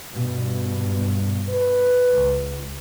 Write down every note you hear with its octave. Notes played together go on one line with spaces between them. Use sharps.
G2 B2
B4
C#2